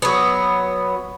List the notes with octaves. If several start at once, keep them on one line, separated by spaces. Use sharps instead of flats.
F#3 B3